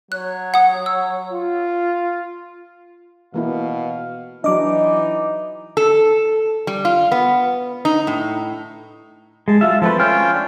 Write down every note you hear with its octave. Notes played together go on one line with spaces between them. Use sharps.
F#3 C#5 F#6
F#5 D#6
E6
F4
B2 E3 A#3 E4 F5
E3 F#3 D4 D#4 D#5 D6
A4
G3
F4
B3
D#4
A2
G#3 A5
F#3 F4 E5
F3 A3 C4 B4 A5
C#4 F4 G5 C6 F6 G6
D4